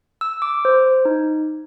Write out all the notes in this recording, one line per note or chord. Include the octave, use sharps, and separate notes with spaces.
E6
D6
C5
D#4